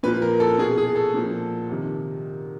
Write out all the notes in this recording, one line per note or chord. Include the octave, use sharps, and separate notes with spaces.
A#2 F3 B4
A#4
A4
B2 G#4
G#4
A4
A#2 F3
C3 D#3